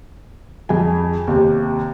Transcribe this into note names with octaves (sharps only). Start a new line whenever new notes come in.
F2 G#4 G#5
D#2 C3